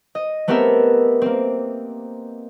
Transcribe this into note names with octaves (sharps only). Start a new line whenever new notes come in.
D#5
A3 B3 C4 G4 A#4 E5
A#3 C4